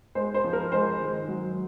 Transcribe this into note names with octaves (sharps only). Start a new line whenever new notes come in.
G#3 C5
C5
F3
A#4
G#3 C5
D#3
F#3